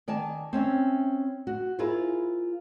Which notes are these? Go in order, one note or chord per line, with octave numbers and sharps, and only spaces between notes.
D#3 D5 G#5 A5
C4 C#4 E5
F#4
E4 F4 G#4 A#4 C5